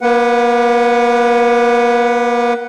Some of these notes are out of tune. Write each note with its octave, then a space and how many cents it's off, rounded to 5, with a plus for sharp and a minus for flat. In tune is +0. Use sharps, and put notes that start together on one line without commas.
A#3 +35 B4 +0 F#5 +0